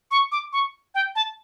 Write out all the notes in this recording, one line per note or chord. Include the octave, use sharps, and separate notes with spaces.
C#6
D6
C#6
G5
A5